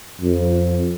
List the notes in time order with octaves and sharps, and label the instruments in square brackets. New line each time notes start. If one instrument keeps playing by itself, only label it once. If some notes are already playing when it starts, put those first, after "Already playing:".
[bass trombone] F2